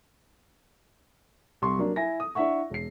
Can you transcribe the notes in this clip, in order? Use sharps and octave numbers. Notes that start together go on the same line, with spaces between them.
C2 C6 C#6
F#3 A#3 D4
E4 G#5 A#6
D#6
D4 E4 E5 F#5 C#6
E1 C7